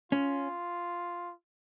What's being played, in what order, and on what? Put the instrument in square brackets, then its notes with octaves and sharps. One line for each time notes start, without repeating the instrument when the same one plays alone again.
[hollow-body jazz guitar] C#4 [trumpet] F4